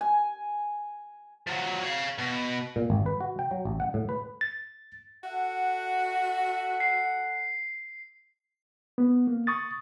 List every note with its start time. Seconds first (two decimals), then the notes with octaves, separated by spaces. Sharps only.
0.01 G#5
1.47 F3 F#3
1.84 C#5 F5
2.18 B2
2.76 A#2
2.90 G#1
3.06 B4
3.21 F#4
3.39 G5
3.51 F#3
3.65 A1
3.80 F#5
3.94 A2
4.09 B4
4.41 A6
5.24 F#4 A4 E5 F#5
6.80 C7
8.98 B3
9.27 A#3
9.47 C#6 D#6 A6